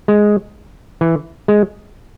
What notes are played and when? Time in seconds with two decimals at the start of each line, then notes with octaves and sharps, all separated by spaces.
0.08 G#3
1.01 E3
1.48 G#3